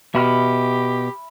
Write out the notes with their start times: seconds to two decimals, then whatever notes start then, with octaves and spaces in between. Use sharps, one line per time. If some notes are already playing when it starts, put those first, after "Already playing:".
0.15 B2 G4 E5 B5 F6